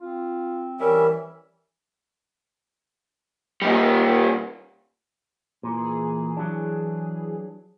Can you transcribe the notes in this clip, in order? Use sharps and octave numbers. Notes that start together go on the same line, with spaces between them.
C4 F4
E3 G3 C#4 A#4 E5
A#2 G3
A#2 E3 G#4
F#3 D4